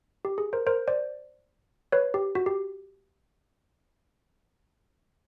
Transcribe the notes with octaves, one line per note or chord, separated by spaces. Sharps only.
G4
G#4
A#4 C5
A#4 C5
C5 D5
B4 C#5
G4
F#4
G4